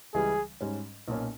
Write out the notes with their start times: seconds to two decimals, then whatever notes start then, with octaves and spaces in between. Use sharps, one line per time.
0.14 C#2 C#3 E3 G3 G#4
0.61 G#2 G3 C#4
1.08 B1 A#2 A#3 C#4